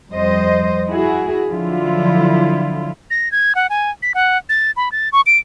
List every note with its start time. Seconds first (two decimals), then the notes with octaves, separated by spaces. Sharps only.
0.12 F2 G3 C5 D#5
0.89 E4 F#4 G#4
1.48 D3 F3 F#3 E4 F4
3.10 A#6
3.32 G#6
3.55 F#5
3.70 G#5
4.02 B6
4.14 F#5
4.49 A6
4.76 B5
4.92 A6
5.12 C#6
5.26 D7